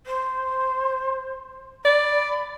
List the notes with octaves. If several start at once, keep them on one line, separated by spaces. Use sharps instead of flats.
C5
D5 B5